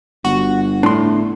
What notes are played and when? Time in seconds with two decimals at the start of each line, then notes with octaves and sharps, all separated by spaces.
0.25 G1 F#4
0.83 A2 D4 C6